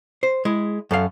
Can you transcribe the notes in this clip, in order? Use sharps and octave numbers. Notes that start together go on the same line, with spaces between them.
C5
G#3 E4
F#2 A4 F5